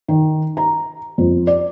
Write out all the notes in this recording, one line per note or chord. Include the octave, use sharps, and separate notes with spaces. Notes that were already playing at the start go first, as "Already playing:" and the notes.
D#3
A#5
F2
D5